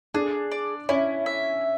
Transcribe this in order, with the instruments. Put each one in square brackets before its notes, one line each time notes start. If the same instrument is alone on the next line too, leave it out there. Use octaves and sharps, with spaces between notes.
[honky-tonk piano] D4 [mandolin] G#4
[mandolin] D5
[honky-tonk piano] C#4 [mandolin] E4
[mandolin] E5